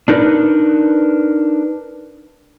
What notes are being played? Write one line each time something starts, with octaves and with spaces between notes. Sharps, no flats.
D4 D#4 A#4 B4